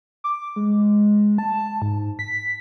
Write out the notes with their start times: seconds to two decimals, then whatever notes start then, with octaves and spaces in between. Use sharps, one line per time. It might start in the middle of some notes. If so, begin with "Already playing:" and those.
0.24 D6
0.56 G#3
1.38 A5
1.82 G#2
2.19 B6